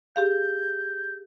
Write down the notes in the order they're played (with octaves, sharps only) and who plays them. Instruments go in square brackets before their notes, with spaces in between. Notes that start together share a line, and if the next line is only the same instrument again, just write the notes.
[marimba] G4 G#4 F5 [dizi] G6